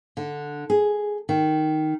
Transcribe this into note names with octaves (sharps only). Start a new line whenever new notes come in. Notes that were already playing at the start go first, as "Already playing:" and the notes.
D3
G#4
D#3